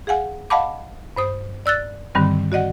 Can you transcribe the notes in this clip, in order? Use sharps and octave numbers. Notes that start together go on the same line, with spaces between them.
G#4 F5 F#5 G#5
D#5 F5 F#5 A5 B5 D6
G2 C5 D#6
D5 E6 F#6 A6
G2 D3 D#3 G3 C4
F#4 D5 D#5 F#5